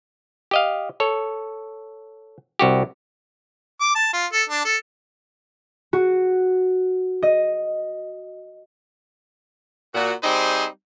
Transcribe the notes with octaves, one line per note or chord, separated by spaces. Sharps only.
G4 D#5 F5
A4 C#5
C2 F#4 G4
D6
A5
F4
A4
D4
A4
F#4
D#5
A#2 F#4
G3 C4 D#4 G#4 C5